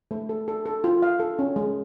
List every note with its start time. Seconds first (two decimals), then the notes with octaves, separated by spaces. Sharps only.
0.11 A3
0.29 A4
0.48 A4
0.66 A4
0.84 F4
1.02 F5
1.20 A4
1.39 C#4
1.56 G#3